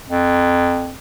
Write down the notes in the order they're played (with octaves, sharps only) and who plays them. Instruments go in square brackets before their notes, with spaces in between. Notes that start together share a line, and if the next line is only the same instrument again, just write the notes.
[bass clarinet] F2